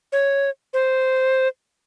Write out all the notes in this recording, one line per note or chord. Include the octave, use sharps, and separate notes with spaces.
C#5
C5